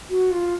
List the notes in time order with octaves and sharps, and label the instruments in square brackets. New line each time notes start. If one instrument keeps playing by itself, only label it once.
[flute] F#4
F4